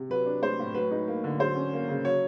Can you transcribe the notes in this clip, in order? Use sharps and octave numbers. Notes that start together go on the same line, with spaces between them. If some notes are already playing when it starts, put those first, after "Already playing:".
Already playing: C3
F#3 B4
D4
A3 C5
A2
F#3 B4
D#4
A#3
D3
F#3 C5
C#4
A#3
C#3
F#3 C#5